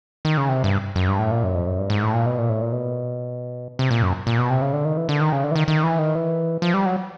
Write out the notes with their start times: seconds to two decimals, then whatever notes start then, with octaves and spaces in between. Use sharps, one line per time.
0.25 D#3
0.37 C#3
0.49 C3
0.64 G2
0.96 F#2
1.08 G2
1.19 A2
1.31 A#2
1.43 F#2
1.55 F2
1.67 F#2
1.79 G2
1.90 G#2
2.03 A2
2.14 A#2
2.26 B2
2.38 A#2
2.49 A2
2.61 A#2
2.72 B2
3.79 C3
3.91 A#2
4.03 F#2
4.27 A#2
4.38 B2
4.50 C3
4.61 C#3
4.73 D3
4.85 D#3
4.97 E3
5.09 D3
5.21 D#3
5.32 C#3
5.44 D3
5.51 E3
5.55 D#3
5.68 D#3
5.83 E3
5.99 D#3
6.15 E3
6.62 F3
6.74 G3
6.86 F#3